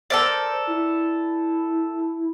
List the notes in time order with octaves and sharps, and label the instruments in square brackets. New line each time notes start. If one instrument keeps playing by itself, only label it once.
[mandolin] A4 A#4 D5 [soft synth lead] C5
[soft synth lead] E4